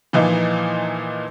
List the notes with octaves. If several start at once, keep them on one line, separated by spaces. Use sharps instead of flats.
A#2 E3 F3 D#4